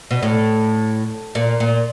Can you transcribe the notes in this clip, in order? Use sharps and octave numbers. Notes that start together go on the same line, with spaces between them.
B2
A2
A#2
A#2